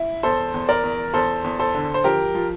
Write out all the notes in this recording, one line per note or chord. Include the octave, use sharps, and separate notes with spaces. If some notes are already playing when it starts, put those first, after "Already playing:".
Already playing: E4
E2 A4 C5
E2
A#4 D5
E2
E2 A4 C5
E2
A4 C5
D3
C5
F3 G4 A#4
F3